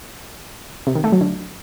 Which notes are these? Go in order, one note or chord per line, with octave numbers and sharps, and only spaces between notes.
C3
D#3
A3
F#3
D3